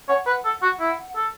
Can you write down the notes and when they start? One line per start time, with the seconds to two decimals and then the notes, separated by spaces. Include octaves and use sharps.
0.09 C#5 F#5
0.27 B4
0.45 A4
0.62 F#4
0.80 E4
1.16 A4